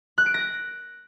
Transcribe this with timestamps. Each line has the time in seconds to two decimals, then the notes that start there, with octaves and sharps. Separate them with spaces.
0.18 F#6
0.26 D7
0.34 A#6